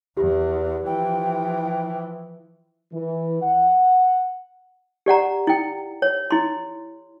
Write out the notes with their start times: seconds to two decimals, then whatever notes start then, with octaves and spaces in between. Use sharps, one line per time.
0.17 E2 G4
0.86 E3 F3 G5
2.94 E3
3.42 F#5
5.06 G4 D5 F#5 A#5
5.47 E4 G5
6.02 C#5
6.31 E4 C6